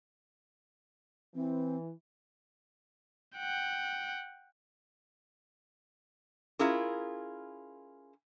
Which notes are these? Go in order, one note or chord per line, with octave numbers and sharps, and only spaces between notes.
E3 C4
F#5 G5
C#4 E4 F4 G#4 A#4